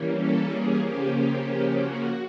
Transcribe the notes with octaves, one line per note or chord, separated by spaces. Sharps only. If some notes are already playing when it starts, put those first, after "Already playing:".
Already playing: E3 G3 A#3 C#4
A4
G#4
C#3 F3 A#3 C#4 G4
G4
G4
F#4